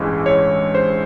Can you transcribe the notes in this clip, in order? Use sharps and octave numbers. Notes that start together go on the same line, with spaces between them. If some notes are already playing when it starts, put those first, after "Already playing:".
Already playing: A1 G2 E3 G#3
C#5
C5